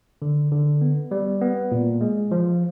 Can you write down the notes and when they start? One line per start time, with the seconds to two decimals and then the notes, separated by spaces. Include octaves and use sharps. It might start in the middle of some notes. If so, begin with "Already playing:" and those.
0.22 D3
0.52 D3
0.81 B3
1.11 G3
1.41 B3
1.72 A#2
2.01 G#3
2.31 F3